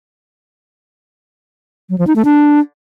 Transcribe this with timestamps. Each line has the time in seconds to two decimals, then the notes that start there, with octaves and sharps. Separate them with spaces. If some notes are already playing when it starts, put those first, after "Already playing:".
1.90 F#3
1.98 F3
2.07 D#4
2.16 A3
2.25 D4